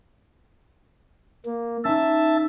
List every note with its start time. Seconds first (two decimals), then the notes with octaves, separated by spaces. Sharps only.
1.45 A#3
1.85 C#4 D#4 E5 A5